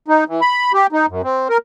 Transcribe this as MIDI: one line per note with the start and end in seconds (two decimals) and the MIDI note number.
0.08 0.24 63
0.28 0.41 52
0.41 0.72 83
0.74 0.87 67
0.92 1.06 63
1.09 1.22 42
1.23 1.48 60
1.49 1.57 70